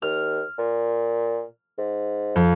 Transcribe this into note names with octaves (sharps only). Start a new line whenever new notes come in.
D#2 F6
A#2
G#2
F2